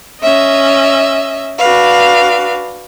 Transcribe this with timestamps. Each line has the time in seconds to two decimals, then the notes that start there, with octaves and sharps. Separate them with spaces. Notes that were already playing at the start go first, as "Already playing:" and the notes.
0.22 C#4 D#5 E5
1.58 D4 F#4 B4 F5